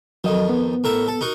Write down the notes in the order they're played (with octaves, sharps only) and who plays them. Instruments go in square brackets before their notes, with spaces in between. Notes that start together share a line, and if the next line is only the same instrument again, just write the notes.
[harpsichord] F2 D#3 [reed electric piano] F#3 D#5
[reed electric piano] B3
[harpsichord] A2 A#4 E5
A4
D#4 F#4 A#4